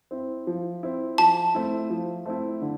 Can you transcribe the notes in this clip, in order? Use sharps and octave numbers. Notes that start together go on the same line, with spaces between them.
C4 E4
F3
C4 E4
F3 A5
A3 C4 E4
F3
A3 C4 E4
D3